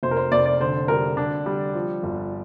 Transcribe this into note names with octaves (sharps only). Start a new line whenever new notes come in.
F1 C5
A#4
C5
F1 D5
D5
D3 C5
G3 A#4
D3 D4
G3
F3
G1